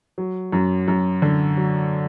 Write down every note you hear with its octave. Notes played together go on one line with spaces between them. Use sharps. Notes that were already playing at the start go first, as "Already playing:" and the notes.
F#3
F#2
F#2
D3
F#3